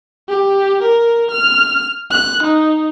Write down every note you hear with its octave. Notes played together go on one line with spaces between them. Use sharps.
G4
A#4
F6
F#6
D#4